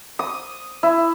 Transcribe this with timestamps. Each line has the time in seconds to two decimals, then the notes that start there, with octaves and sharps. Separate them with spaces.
0.19 D#6
0.83 E4